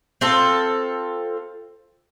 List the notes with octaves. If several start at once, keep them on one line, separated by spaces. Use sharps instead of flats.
C4 F4 A4